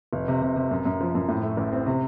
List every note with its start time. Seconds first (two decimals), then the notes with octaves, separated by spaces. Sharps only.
0.13 F1
0.28 C3
0.42 C3
0.56 C3
0.71 F#2
0.85 F#2
1.00 F3
1.15 F#2
1.28 A2
1.43 A3
1.57 A1
1.72 C4
1.86 C3